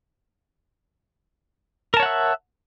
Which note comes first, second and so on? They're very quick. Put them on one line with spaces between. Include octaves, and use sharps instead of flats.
A#4 A5 C#5 F#5 E5